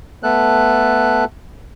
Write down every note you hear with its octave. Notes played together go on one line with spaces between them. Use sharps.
A3 B3 A4 F#6